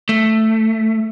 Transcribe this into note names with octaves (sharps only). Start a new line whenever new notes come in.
A3